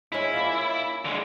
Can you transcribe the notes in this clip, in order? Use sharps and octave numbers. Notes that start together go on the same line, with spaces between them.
G#3 C#4 E4
A#3 C#4 F4
D3 G#3